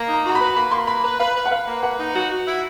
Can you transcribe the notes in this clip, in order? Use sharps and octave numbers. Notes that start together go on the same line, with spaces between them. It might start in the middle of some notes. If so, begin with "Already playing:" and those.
Already playing: A#3
D#4 A#5
F#4 A#5
B4 B5
A#3 B5
A#3 C6
B4 B5
B4 A#5
B4 F5
B4
F#5
B4 F5
A#3
B4 F#5
D#4
F#4
F#4
E4